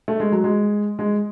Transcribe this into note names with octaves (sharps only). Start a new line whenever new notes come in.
A3
G#3
F#3
G#3
G#3